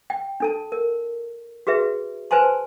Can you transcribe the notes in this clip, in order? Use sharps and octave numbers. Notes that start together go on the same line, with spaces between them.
G5
D4 A4 A5
A#4
F#4 G#4 B4 E5
B4 C5 G#5 A5 C6